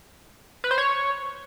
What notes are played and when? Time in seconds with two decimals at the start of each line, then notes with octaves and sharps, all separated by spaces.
0.64 B4
0.71 C5
0.78 C#5